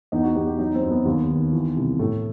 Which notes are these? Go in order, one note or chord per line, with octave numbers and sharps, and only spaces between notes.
E2 D#4
F#4
E2 G4
G4
F#3 D#4
C4
F#2
B3
D#2
D#3
E3
C2
A2 A3